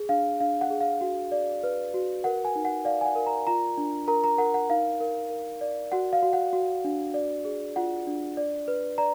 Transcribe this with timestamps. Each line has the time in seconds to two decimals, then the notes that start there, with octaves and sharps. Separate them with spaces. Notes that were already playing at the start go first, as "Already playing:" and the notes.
Already playing: G#4
0.09 D4 F5
0.40 D4 F5
0.61 F#5
0.70 G#4
0.81 F5
1.01 F#4
1.32 D5
1.63 B4
1.94 F#4
2.24 A#4 F#5
2.45 G#5
2.55 D#4
2.65 F#5
2.85 D5 F5
3.01 G#5
3.06 F#5
3.16 A#4
3.27 A#5
3.47 F4 A#5
3.78 D4
4.08 A#4 A#5
4.24 A#5
4.38 A#4 F#5
4.54 F#5
4.70 D#4 F5
5.00 A#4
5.30 A#4
5.61 D5
5.92 F#4 F#5
6.13 F5
6.23 F#4
6.33 F#5
6.53 F#4
6.85 D4
7.14 D5
7.45 G#4
7.76 F4 F#5
8.07 D4
8.37 D5
8.68 B4
8.98 D5 A#5